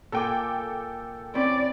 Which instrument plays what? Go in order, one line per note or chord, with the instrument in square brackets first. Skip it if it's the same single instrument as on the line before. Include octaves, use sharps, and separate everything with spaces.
[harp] A#2 G#5 [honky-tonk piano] A4 G5 D6
[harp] C4 C#4 E4 [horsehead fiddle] D5